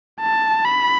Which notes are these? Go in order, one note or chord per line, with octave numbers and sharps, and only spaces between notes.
A5
B5